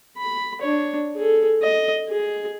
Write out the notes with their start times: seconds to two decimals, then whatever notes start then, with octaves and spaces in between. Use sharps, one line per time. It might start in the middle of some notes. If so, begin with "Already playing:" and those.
0.18 B5
0.62 D4 C#5
1.16 G#4 A4
1.62 D#5
2.09 G#4